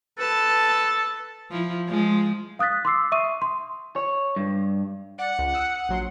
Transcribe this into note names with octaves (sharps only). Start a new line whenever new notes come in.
A4 B4 A5
F3 E4
F3 G#3
F5 D#6 F#6 A6 B6
C6 D6 E6 C7
E5 C#6 D#6 D#7
C6
C#5
G2
D5 F#5
C#2
D#6 E6 F#6
A#1 F#3 C6